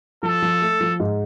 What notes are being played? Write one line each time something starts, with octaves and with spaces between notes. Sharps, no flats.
F3 A4
F3
A3
F3
G#2